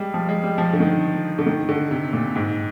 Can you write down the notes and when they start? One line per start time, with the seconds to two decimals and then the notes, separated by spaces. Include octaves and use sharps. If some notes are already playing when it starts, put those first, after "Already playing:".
Already playing: G3 G#3
0.14 F3
0.28 G#3
0.43 G3
0.58 F3
0.73 D3
0.80 D#3
1.39 D3
1.47 D#3
1.69 D3
1.91 C3
2.13 A#2
2.35 G#2